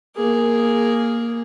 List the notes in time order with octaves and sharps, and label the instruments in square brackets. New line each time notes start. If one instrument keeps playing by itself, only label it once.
[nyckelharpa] A#3 G#4